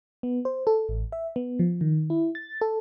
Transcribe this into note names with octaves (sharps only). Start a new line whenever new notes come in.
B3
C5
A4
A1
E5
B3
F3
D#3
E4
A6
A4